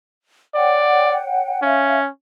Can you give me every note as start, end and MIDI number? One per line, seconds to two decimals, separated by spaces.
0.55 1.61 73
0.55 1.19 74
0.55 1.61 78
0.55 1.61 79
1.62 2.09 61
1.62 1.98 76
1.62 1.98 77